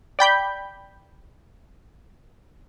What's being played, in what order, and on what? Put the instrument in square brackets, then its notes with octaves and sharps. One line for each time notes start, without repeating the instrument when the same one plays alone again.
[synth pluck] D5 G5 B5 G6